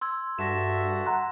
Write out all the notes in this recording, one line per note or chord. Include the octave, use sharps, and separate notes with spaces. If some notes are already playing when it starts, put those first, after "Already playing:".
C6 E6 G#6
G2 F#4 A4 E5 A#6 E7
F#5 A#5 C6 F#6